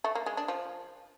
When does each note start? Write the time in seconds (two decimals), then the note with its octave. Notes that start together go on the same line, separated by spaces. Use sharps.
0.04 A3
0.15 A#3
0.26 G#3
0.37 D4
0.48 F3